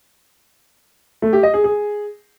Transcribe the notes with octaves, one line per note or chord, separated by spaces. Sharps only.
A3
G4
D#5
G#4
G#4